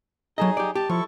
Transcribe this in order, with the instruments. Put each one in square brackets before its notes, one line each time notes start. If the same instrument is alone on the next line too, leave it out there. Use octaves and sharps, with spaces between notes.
[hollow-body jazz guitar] F#3 A4 D#5 [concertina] D#4 G#4
[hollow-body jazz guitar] G4 D5
[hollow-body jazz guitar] G4 [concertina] A5
[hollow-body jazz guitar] F3 [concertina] E4 A4 C#6